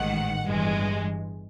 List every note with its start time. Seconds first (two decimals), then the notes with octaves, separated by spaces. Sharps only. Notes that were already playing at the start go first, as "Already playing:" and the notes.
Already playing: A1 G#2 D#3 F#5
0.42 G1 G2 E3 G#3